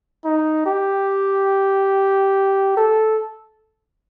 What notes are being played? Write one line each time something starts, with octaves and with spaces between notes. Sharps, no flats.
D#4
G4
A4